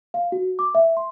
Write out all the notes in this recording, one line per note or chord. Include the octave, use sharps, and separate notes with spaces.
F5
F#4
D6
E5
C6